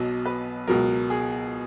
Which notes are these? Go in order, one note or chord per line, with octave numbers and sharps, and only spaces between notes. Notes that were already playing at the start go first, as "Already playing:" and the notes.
Already playing: B1 B2 F#3 D#5
B4
C#2 B2 F#3 A#4
G#4